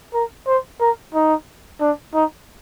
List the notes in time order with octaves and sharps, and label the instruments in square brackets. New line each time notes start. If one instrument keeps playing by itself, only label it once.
[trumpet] A#4
C5
A#4
D#4
D4
D#4